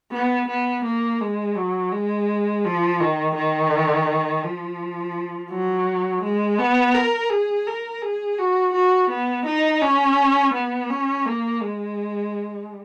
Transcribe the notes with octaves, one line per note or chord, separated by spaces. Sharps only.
B3
B3
A#3
G#3
F#3
G#3
F3
D#3
D#3
F3
F#3
G#3
B3
A#4
G#4
A#4
G#4
F#4
F#4
B3
D#4
C#4
B3
C#4
A#3
G#3